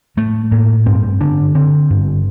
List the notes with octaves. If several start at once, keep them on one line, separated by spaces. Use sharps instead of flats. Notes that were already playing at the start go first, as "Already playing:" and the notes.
A2 A3
A2 A#3
G2 C4
D3 D4
D3 C4
G2